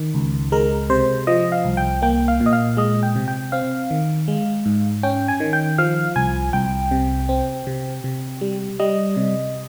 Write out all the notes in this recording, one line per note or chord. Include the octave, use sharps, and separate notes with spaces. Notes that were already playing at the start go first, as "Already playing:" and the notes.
Already playing: D#3
C#2
G#3 A#4
C3 C5
F3 D#5
F5
C2
G5
A#3 G5
F5
A#2
D#5
F5
G#3 D#5
G5
C3
G5
C4 F5
D#3
G#3
G#2
C#4 G5
G#5
D#3
G5
F3 F5
C2 G#5
C2 G5
C3
C4
C3
C3
G3
G3 D#5
C3